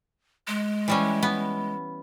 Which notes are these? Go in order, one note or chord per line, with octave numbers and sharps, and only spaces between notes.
G#3
E3 G3 C#4
B3